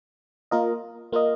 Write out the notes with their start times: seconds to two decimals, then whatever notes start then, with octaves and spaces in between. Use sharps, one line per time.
0.51 A#3 F4 A#4 D#5
1.12 A#3 F4 A#4 D#5